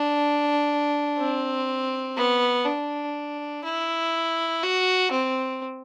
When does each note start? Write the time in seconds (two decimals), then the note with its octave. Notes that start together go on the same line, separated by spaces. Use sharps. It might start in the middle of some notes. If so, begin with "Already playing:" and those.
Already playing: D4
1.19 C4
2.17 B3
2.65 D4
3.64 E4
4.63 F#4
5.12 C4